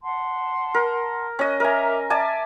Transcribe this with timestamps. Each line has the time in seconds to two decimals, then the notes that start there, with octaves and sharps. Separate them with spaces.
0.02 F#5 A5 C6
0.74 A#4
1.39 C#4 D#5 F#6
1.60 A#4 E5 G#5 A#5 D6
2.10 D5 E5 G#5 A5